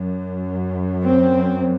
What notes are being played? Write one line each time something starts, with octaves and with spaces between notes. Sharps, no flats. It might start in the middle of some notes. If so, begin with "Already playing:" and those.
Already playing: F#2
C4